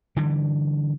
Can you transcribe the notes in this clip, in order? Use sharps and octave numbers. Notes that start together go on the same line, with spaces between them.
D3 E3 G3